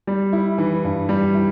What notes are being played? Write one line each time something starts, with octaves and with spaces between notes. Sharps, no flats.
G3
E4
E3
G2
G3
E4